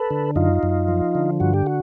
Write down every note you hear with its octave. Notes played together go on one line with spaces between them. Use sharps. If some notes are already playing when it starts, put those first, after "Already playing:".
Already playing: A4 B4
D3
F#2 D#4 F4
F#2
F3
D3
G2 F#4
G4
F#4